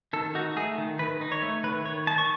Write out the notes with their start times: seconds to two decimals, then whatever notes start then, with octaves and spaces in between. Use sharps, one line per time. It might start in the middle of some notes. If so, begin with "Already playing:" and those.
0.13 D#3 A4
0.35 D#4 F#4
0.56 A3 G#4
0.78 D#3
0.99 D#3 B4
1.21 D#4
1.32 C#5
1.42 A3
1.63 D#3 B4
1.85 D#3 C#5
2.07 D#4 A5
2.18 C#6